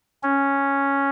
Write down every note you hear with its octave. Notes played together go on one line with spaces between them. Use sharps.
C#4